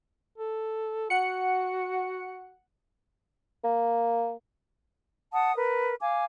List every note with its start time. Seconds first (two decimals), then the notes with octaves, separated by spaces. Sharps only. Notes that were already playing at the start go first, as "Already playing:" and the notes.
0.38 A4
1.10 F#4 F#5 C#7
3.64 A#3
5.33 F#5 A5 D#6
5.56 A#4 B4
6.01 F5 G#5 D6